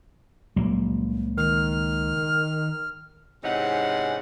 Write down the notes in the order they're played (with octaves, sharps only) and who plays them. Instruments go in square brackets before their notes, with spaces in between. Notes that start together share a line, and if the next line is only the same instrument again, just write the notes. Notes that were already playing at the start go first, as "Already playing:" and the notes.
[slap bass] C#2 A#3 [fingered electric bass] A#2 F#3 G3
[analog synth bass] D#3 [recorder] F6
[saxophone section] G#2 C3 E3 C#4 D#4 F#5